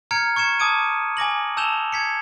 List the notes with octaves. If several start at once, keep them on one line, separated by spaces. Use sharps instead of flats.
A#5 F6 G#6 C#7 D7
C#6 G#6 C#7 E7
A5 D6 D#6 G#6 D7 D#7
G#5 D6 A#6 F#7
A5 E6 G6 E7 F7 G7
G#6 B6 C#7